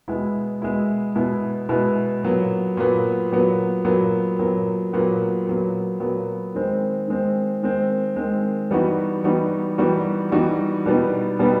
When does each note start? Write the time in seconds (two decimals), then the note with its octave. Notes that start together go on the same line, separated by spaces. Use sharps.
0.08 B2 G#3 B3 E4
0.62 B2 G#3 B3 E4
1.15 B2 G#3 B3 E4
1.69 B2 G#3 B3 E4
2.23 A#2 F#3 B3
2.77 A#2 F#3 B3
3.32 A#2 F#3 B3
3.85 A#2 F#3 B3
4.39 A#2 F#3 B3
4.93 A#2 F#3 B3
5.47 A#2 F#3 B3
6.00 A#2 F#3 B3
6.55 D#3 G#3 C4
7.08 D#3 G#3 C4
7.63 D#3 G#3 C4
8.16 D#3 G#3 C4
8.71 E3 G3 B3 D#4 F#4
9.24 E3 G3 B3 D#4 F#4
9.78 E3 G3 B3 D#4 F#4
10.32 E3 G3 B3 D#4 F#4
10.86 B2 G3 B3 D#4
11.39 B2 G3 B3 D#4